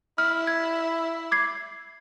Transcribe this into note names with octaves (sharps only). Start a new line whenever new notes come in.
E4 F6
G#6
D6 G#6 C7